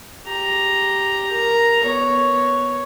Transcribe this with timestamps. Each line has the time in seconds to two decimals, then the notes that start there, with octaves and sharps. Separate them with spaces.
0.25 G4 A#5
1.32 A#4 A#5
1.84 B3 C#5